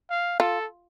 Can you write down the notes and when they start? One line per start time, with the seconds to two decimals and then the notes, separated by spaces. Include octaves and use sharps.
0.10 F5
0.40 F4 A4